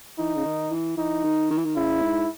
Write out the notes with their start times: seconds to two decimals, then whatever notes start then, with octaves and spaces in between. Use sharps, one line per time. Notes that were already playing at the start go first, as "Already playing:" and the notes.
0.18 E3 D#4
0.36 C#3
0.45 D#3
0.71 E3
0.97 E3 D#4
1.24 D#3
1.50 D#3
1.58 E3
1.65 D#3
1.76 C#3 E4
2.02 G#2